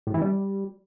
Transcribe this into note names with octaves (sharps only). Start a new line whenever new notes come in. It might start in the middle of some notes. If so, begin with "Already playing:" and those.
A2
E3
G3